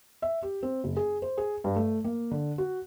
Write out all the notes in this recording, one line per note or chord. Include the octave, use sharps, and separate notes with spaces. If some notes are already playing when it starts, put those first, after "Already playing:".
E5
G4
C4
F#1
G#4
C5
G#4
G2
A3
A#3
D3
F#4